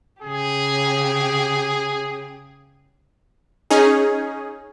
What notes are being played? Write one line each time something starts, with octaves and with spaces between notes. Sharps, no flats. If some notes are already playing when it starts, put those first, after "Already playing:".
C#3 G4 G#4
C#4 D#4 G#4